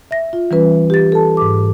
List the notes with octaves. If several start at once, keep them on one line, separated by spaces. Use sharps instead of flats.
E5 A#6
F4
E3 G3 C#4 B4
G4 A6
A4 A5
G#2 D6